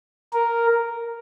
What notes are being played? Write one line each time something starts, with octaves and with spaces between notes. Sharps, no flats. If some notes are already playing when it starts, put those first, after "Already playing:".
A#4